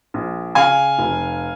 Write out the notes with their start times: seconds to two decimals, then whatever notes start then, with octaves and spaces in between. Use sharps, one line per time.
0.14 A#1
0.55 C#3 F5 G#5
0.99 F1